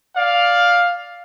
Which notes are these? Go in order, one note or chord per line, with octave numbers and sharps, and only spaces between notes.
D5 F5